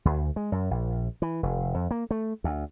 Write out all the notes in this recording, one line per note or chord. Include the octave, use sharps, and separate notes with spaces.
D2
G#3
F#2
A#1
E3
F1
F2
A#3
A3
D2